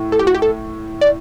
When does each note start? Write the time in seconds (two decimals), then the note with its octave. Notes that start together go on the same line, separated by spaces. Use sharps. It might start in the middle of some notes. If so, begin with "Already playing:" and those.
Already playing: A2
0.12 A4
0.19 G4
0.27 F#4
0.34 G4
0.42 A4
1.01 D5